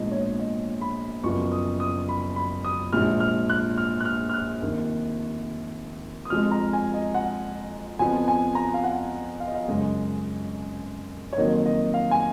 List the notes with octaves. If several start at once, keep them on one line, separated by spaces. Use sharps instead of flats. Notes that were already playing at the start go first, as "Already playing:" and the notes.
Already playing: A#1 G#2 F3 B3 D#5
C#5
D#5
B5
F#1 F#2 F3 B3 C#6
D#6
D#6
B5
B5
D#6
A#1 G#2 F3 F6
F6
F#6
F6
F#6
F6
F6
F#6
F1 D#2 D#3
D#6
F2 F3 G#3 F6
A#5
G#5
D#5
F#5
F2 F3 B3 G#5
G#5
A#5
F5
F#5
F5
D#5
F5
F#2 C#3 G#3 D#5
C#5
F2 D#3 F#3 A#3 D#5
D#5
F5
G#5